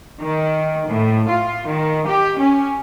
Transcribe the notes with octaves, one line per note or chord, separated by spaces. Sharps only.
D#3
A2
F4
D#3
G4
C#4